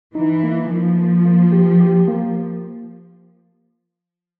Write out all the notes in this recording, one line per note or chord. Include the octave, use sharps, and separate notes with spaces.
E3 D#4
A#3
F3 A#3
A#3
A#3
G4
G4
A#3